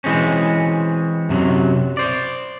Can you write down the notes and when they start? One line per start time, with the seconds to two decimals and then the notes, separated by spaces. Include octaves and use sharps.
0.04 E3 G#3 C4 C#4
1.29 F#2 C3 E3 F#3
1.97 C5 D5